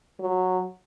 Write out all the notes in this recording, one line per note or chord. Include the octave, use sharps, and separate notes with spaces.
F#3